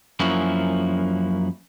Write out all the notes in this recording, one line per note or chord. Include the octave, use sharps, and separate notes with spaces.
F#2 F3 A#3 C#4 E4 F#4